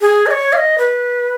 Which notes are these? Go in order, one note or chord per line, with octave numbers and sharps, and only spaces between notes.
G#4
D#5
C#5
F5
D#5
B4